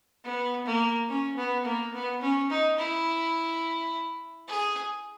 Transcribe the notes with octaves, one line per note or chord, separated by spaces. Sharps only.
B3
A#3
C#4
B3
A#3
B3
C#4
D#4
E4
G#4